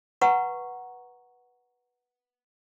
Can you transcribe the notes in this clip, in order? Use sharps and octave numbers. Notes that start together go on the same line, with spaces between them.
B4 F#5 A#5 C#6